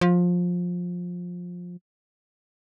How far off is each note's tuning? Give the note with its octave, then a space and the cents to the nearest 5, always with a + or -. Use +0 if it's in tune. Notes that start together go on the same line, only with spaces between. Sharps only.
F3 +20